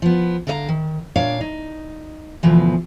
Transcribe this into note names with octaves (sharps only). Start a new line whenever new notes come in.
F3 B3
D3 A4 A#4 D#5 F5 A#5
D#3
A#2 D4 C#5 D5 F5
D#4
D2 B2 E3 F3